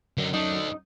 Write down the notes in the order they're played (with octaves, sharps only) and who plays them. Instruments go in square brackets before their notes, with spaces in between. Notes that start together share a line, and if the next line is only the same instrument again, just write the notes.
[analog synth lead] F#2 [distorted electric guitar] D3 D#4
[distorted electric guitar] A3 D4 [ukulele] D#4